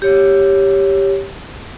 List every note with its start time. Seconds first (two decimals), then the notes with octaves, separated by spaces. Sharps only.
0.02 G4 C#5